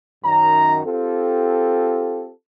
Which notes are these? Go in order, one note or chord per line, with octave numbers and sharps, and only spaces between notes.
F#2 D#3 A#5
C4 F4 G4 A4